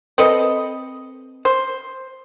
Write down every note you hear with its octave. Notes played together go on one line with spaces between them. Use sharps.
C4 A4 B4 D#5
C5